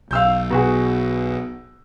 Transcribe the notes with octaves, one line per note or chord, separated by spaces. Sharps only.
B1 F5 E6 G6
B2 F#4 G#4